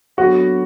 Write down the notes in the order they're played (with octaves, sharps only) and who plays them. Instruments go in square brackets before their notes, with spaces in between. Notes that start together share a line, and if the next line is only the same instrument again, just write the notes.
[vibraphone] F#3 B3 D4 A4 C#5 [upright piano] F#4